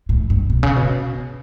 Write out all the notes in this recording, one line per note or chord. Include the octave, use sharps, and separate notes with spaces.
A2
G2
B2
C#3
B2